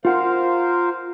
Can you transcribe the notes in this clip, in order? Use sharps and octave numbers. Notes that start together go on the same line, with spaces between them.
F4 A#4 C5 F5 F#5